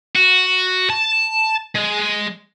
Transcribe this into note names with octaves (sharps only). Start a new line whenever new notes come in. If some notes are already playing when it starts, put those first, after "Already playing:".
F#4
A5
G#3